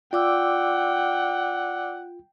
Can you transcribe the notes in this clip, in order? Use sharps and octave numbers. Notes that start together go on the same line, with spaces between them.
F4 D5 F#5 G5 D6 E6